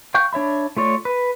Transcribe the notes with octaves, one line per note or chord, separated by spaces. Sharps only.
F5 G5 C#6 F#6 G6
D4 C#5 E5 B5
A3 F4 C#5 D5
B4